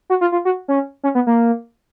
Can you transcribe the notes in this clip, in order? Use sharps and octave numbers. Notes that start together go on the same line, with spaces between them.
F#4
F4
F4
F#4
C#4
C#4
B3
A#3